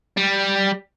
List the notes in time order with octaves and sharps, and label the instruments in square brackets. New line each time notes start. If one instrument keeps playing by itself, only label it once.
[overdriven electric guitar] G3